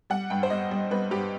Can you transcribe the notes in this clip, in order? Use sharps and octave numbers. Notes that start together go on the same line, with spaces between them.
G3 F#5
G2 G5
C5
G3 D#5
G3
G3 B4
G2 G4